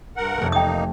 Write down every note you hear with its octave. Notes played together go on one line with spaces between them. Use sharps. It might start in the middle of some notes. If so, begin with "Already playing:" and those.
G2 A#4 F#5
F1 A3
A#3 D#4 G5 D#6